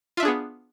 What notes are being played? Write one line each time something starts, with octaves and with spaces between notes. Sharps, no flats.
B3 D4 F4 G#4 E5